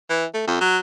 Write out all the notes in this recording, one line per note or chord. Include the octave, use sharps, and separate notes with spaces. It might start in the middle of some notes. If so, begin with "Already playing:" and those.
E3
A3
F2
F#3